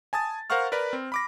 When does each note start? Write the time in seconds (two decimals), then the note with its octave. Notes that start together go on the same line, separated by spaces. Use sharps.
0.13 G#5 A5 D#6 A6
0.50 A#4 C5 F5 F#5 C#6 F6
0.72 A#4 B4 D5 B5
0.93 C4
1.12 B5 D6 A#6